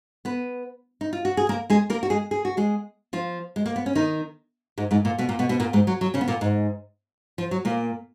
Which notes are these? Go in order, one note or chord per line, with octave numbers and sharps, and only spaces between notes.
B3 B4
D#4
F4
F#4
G#4
A#3 A#4
G#3 G#4
A#3 A#4
F#4
G#3 G#4
G#4
F#4
G#3 G#4
F3 F4
G#3
A#3
B3
C#4
D#3 D#4
G#2 G#3
G#2 G#3
A#2 A#3
B2 B3
A#2 A#3
B2 B3
B2 B3
A#2 A#3
G#2 G#3
F#3
F#3
C#3 C#4
B3
A#2 A#3
G#2 G#3
F3
F#3
A#2 A#3